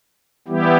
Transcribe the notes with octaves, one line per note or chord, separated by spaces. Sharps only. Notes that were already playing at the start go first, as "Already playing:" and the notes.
E3 G3 B3 E4 G4